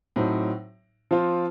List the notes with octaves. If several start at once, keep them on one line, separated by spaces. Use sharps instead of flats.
A2 F#3 C4 D#4
F3 C4 F4